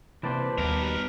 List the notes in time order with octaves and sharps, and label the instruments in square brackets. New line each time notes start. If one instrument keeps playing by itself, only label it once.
[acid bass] C3 [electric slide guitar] E3 A#3 C5 [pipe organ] B4 D5 A5
[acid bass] D#2 [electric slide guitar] B2 G3 B3 [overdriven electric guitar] G4 A#4